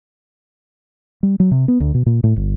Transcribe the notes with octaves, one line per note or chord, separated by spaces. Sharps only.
G3
F#3
C3
B3
D2
B2
A#2
A2
G1